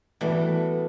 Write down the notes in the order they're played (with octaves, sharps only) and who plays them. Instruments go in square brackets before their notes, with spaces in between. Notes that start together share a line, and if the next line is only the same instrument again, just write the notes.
[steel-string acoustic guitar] A2 G3 B3 F#4 A4 [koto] E3